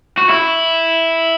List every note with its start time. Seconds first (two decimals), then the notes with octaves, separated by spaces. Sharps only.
0.17 F#4
0.29 E4